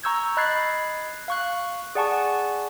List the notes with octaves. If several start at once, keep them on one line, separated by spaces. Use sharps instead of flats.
A#5 C#6 E6 G6 G#6
D#5 B5 F#6 G#6 A6 C7
F5 C#6 F#6
G#4 D5 F#5 G#5 A5 C#6